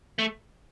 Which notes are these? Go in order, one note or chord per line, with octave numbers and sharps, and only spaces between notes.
A3